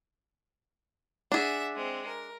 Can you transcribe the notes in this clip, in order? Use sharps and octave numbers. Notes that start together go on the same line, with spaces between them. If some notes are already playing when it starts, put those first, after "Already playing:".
D4 G#4 E5 F#5
G#3 C4
A#4